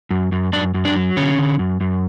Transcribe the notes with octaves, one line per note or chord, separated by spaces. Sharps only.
F#2
F#2
F#2 D4 D5
F#2
D4 D5
F#3
D3 C#4 C#5
D3
F#2
F#2